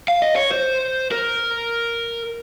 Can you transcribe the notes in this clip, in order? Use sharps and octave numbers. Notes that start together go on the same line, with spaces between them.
F5
D#5
C#5
C5
A#4